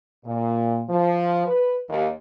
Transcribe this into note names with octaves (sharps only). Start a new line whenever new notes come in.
A#2
F3
B4
D#2